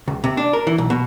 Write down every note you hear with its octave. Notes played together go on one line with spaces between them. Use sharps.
C#2
C3
D4
A#4
E3
B1
B2